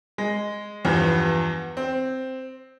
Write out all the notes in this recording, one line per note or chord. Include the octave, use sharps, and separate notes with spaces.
G#3
E2 G2 F3 B3
C4